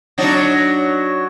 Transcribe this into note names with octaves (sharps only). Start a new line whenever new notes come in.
F#3 D4 D#4